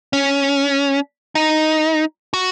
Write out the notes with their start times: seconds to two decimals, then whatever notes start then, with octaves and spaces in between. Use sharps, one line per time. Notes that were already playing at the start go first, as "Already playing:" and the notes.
0.13 C#4
1.35 D#4
2.33 F#4